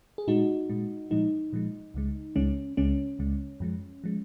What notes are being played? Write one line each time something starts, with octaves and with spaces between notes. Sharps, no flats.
G#4
A#2 G#3 D#4 F#4
A#2 G#3
A#2 F3 G#3 D#4
A#2 F3 G#3
C#2 C#3 G#3
C#2 C#3 G#3 C#4
C#2 C#3 G#3 C#4
C#2 C#3 G#3
F#2 F3 G#3
F3 G#3